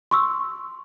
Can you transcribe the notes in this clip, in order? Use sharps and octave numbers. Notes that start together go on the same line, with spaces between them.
C6 C#6 E6